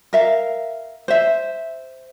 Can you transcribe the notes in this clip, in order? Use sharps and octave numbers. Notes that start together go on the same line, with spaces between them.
A#4 E5 F5
C5 E5